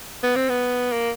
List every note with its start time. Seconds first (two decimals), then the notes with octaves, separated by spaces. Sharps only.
0.23 B3
0.36 C4
0.49 B3
0.92 A#3